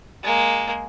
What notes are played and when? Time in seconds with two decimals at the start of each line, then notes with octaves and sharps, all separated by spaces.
0.23 G#3 A#3